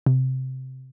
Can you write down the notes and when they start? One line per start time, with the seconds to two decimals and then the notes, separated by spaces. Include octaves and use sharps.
0.06 C3